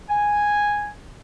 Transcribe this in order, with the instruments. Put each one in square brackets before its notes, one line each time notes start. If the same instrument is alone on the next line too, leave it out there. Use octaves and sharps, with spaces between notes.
[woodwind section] G#5